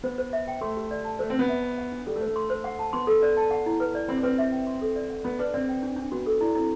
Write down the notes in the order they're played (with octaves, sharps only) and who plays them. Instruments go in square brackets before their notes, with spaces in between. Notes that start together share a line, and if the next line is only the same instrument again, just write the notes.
[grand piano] B3 [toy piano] C5
[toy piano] C5
E5
G5
[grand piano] A3 [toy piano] C6
[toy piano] G4
D5
A5
[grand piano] A3 [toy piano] C5
[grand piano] C4
[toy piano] C5
[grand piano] B3
[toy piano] E5
B5
F#5
D4
[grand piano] G3 [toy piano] A4
[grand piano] A3
[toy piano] C5
[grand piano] A3
[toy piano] C6
C5
F#5
A5
[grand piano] B3 [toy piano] C6
[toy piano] A4
D5
A5
F#5
E4
B4
D5
[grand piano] C4 [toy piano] B5
[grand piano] D4
[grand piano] C4 [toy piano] B4
[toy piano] E5
G5
C6
A4
D5
F#5
[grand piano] B3 [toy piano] B5
[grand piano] D4 [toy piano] B4
[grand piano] C4 [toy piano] D5
[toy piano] G5
D4
D4
[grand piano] B3 [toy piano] F#4
[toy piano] A4
[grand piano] D4 [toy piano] E4
[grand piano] C4 [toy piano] E4